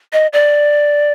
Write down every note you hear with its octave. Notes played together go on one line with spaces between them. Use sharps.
D#5
D5